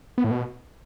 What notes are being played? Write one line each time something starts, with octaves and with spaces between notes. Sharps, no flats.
B3
A2
B2